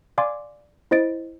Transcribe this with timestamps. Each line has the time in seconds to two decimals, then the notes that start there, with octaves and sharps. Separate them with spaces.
0.18 D5 F5 G#5 C6 D6
0.91 E4 C5 D#5 A6 D7